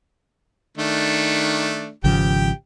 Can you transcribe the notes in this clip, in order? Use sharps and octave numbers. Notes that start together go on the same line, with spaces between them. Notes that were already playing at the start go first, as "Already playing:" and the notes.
D#3 A3 D4
G#1 C#3 F3 G4 G5